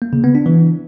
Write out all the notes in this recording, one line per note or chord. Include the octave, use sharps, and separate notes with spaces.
A#3
C#3
B3
D4
E3